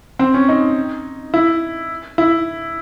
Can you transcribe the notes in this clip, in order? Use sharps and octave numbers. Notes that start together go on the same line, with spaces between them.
C4
C#4
D#4
E4
E4